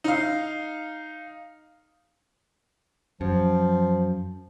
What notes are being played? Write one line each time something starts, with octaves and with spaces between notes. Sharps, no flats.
D#4 F5
F#2 F3